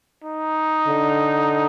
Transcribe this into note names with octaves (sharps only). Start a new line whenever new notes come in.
D#4
D3